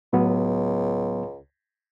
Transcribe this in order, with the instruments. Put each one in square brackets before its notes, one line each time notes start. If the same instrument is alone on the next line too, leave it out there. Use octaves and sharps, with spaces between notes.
[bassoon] C#2 [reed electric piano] A2 F#3 B3